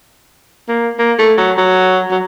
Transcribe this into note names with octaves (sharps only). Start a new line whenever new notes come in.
A#3
A#3
A3
F#3
F#3
F#3